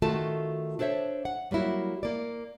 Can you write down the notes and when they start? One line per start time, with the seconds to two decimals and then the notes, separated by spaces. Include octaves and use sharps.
0.02 D#3 A3 F4 F#4 A4 A5
0.79 D4 A4 C5 C#5 E5
1.25 F#5
1.51 F#3 G3 A#3 E4 F#4
2.03 A#3 D5